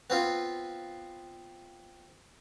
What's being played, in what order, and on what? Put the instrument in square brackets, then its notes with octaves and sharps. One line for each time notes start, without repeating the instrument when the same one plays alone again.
[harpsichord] B3 C4 F4